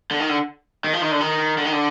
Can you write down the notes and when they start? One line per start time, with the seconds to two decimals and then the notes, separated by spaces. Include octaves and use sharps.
0.11 D3
0.20 D#3
0.29 D3
0.84 D#3
0.93 F3
1.02 D#3
1.11 D3
1.21 D#3
1.58 D3
1.65 D#3
1.72 D3